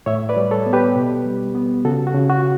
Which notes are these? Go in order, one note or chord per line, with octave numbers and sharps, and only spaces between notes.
A2 C#5 E5
B4 D5
G3
A4 C#5
B3
G4 B4
B2
G3
B3
C#3 F#4 A4
F#4
C#3
F#4